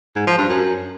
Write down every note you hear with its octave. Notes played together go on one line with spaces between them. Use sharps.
G#2
F3
G2
F#2